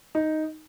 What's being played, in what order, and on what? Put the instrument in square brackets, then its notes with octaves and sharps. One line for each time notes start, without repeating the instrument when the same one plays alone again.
[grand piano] D#4